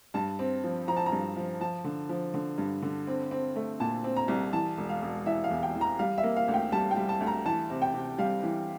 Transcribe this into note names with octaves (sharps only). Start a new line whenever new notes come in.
G2 A5
C4
F3
F3 A#5
A5
A#5
G2
F3
F3 A5
D3
F3
D3
G2
D3
C4
C4
A3
A#2 A5
C4
A#5
C2
E3 A5
E1
F5
E1
E3 E5
F5
E2
G5
E3
A#5
G3 F5
E5
A#3
F5
D2
G5
G3 A5
G5
G3
A5
D2
A#5
E3 A5
C3
G5
C3
G3 F5
E3